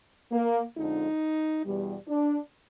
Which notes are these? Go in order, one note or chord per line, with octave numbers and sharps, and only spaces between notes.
A#3
F2 D3 F3 G#3 D#4
E2 B2 G3
D4